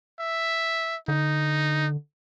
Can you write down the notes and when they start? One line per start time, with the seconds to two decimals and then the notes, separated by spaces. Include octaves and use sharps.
0.19 E5
1.08 D3 D#4